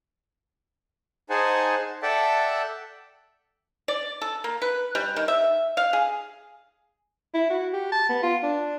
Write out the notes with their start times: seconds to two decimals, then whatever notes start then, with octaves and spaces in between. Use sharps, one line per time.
1.30 D#4 G#4 C5 F#5 G#5 A5
2.02 A4 D5 E5 F#5 G5 A5
3.88 D5
4.21 A4
4.44 A#3
4.62 B4
4.95 G3
5.16 D#3
5.28 E5
5.77 F5
5.93 G#4
7.34 E4
7.50 F#4
7.73 G4
7.92 A5
8.09 B3
8.22 F4
8.43 D4